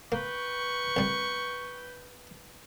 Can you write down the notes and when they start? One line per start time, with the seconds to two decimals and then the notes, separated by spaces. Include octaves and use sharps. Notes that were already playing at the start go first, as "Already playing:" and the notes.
0.12 A#3 B4 G5 C#6
0.97 C2 G3